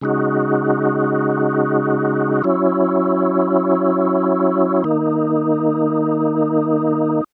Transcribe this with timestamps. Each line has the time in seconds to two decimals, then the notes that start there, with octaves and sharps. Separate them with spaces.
0.01 C#3 G#3 D#4 F#4
2.43 F#3 C#4 E4
4.84 D#3 A#3 D#4